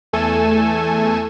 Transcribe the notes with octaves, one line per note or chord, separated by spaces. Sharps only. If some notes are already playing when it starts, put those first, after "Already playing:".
E2 A3 A4 G#5 E7